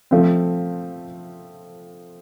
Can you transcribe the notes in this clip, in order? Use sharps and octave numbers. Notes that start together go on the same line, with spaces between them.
F3 A3 C4